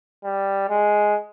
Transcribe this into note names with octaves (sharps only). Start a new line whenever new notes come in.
G3
G#3